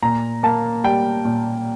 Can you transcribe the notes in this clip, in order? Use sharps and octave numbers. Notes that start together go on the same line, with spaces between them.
A#2 A#5
A#3 A5
G3 G5
A#2